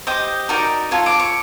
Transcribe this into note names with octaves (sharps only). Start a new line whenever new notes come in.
G4 C5 D#5 D#6
D#4 F#4 A#4 D5
F4 A4 C#5
D6
C#6